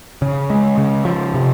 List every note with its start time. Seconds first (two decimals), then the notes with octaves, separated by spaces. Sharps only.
0.22 C#3
0.50 G#3
0.78 C#3
1.05 F3
1.34 C3